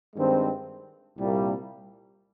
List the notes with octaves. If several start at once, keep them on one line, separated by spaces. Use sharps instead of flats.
G2 D#3 G#3 C4
C2 A#2 G3 A#3